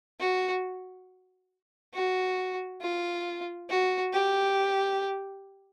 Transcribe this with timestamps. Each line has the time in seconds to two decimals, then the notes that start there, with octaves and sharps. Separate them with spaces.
0.20 F#4
1.95 F#4
2.82 F4
3.70 F#4
4.13 G4